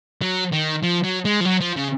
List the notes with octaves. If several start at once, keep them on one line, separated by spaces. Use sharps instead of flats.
F#3
D#3
F3
F#3
G#3
F3
F#3
F3
C#3